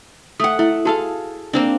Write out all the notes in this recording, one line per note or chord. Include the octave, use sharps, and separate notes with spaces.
A3 F#5 G5 D#6
A3 E4
F#4 G#4 A4 F5 A5
A#3 C4 D4 D5